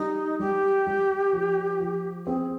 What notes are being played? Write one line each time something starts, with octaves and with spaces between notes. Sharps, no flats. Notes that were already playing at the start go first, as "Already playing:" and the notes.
Already playing: G3 D#4
G3 G4
G3
F3
F3
C4 G#4